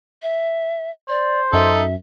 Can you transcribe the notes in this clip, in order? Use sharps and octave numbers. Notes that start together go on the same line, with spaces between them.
E5
C5 D5
F#2 D#4 A4 E5